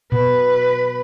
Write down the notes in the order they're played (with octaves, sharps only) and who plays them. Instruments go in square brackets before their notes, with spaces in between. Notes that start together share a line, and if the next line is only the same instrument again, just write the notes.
[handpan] B2 [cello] B4